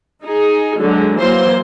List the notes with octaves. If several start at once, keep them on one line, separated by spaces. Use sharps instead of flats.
D#4 G#4
D3 F#3 G#3
E3 F#3 A#3 C5 C6